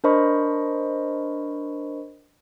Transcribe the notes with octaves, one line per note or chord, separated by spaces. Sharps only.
D4 A#4 C5 D#5 B5 C#6